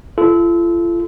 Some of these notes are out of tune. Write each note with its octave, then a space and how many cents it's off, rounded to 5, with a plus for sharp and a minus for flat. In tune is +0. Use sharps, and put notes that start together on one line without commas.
F4 -40 A4 -25